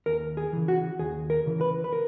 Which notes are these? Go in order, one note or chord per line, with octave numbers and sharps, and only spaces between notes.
D#2 A#4
G#4
C#3 E3
F#4
D#2 G#4
A#4
C#3 E3
B4
B4
A#4